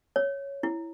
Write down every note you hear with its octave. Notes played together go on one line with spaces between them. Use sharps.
C#5
E4